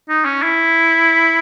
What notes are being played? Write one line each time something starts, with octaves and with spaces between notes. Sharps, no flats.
D#4
C#4
E4